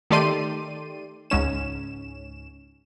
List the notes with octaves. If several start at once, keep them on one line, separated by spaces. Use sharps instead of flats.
D#3 A3 G4 D5 C6 D#7
C#2 G#2 C#4 E7